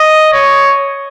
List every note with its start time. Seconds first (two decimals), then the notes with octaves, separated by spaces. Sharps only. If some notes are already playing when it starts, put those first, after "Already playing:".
Already playing: D#5
0.33 C#5